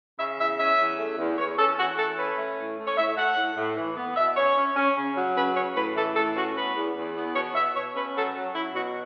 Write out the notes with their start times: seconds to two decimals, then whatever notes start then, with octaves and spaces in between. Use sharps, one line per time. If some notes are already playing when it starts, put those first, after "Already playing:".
0.18 C#3 E5
0.38 E2 E5
0.58 C#4 E5
0.78 E2
0.98 A3
1.18 E2
1.38 E2 C#5
1.58 C#4 A4
1.78 E3 F#4
1.98 A3 A4
2.18 C#4 B4
2.38 A3
2.58 A2
2.78 A3
2.86 C#5
2.97 A2 E5
3.17 A3 F#5
3.37 A2
3.57 A2
3.77 E3
3.97 B3
4.16 B2 E5
4.36 C#4 C#5
4.56 C#4
4.76 C#4
4.96 C#3
5.16 F#3
5.36 C#3 B4
5.55 C#3 C#5
5.76 A2 B4
5.96 E3 A4
6.15 A2 A4
6.35 C#4 F#4
6.55 B3 B4
6.76 E2
6.95 E2
7.15 B3
7.35 B2 C#5
7.55 B2 E5
7.75 B2 C#5
7.95 C#4 B4
8.15 F#3 A4
8.35 F#3
8.55 F#3 E4
8.75 B2 F#4